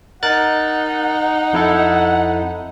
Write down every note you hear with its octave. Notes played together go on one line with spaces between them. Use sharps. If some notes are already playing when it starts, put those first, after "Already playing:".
D#4 A#4 F#5 F#6 A6
F2 E4 A4